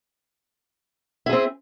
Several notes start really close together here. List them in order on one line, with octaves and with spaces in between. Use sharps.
E4 G#4 C4